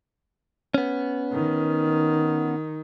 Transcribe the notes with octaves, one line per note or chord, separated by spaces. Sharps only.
B3 C#4
D#3